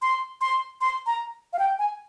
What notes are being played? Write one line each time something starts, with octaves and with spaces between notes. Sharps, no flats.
C6
C6
C6
A#5
F5
G5
G#5